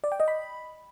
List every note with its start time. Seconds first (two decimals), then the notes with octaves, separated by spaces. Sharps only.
0.04 D5
0.12 G5
0.20 D#5
0.28 B5